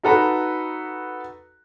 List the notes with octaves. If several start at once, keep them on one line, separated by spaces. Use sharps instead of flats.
D#4 F#4 A4 B4 A#5